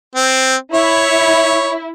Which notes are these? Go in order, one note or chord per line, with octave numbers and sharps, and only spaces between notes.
C4
E4 C#5